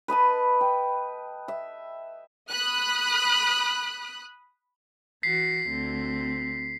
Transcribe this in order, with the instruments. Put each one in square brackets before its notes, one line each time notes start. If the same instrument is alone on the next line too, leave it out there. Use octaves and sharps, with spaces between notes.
[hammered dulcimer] B4 D#5 A5 B5
G5
E5
[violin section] B5 D#6 F#6
[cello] E3 F#4 [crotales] B6 C7
[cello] D2 C4